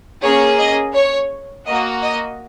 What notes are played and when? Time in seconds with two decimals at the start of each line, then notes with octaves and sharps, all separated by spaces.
0.23 A#3 C#4 G#4 C#5
0.59 D#5
0.94 C#5
1.66 A#3 F#4 D#5
2.02 D#5